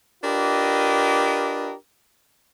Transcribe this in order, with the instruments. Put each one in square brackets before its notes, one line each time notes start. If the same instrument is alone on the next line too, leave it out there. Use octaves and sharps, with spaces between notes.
[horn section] D4 F4 G4 A#4 B4 D#5